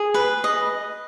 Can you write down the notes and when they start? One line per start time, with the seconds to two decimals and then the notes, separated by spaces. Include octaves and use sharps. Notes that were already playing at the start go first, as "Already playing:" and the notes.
Already playing: G#4
0.14 B4
0.44 D#5